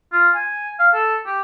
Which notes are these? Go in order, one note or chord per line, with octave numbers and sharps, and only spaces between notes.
F4
G#5
F5
A4
G4